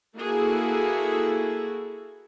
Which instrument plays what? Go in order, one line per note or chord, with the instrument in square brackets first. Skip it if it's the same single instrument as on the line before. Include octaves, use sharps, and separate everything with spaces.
[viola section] A#3 E4 F#4 G#4 A4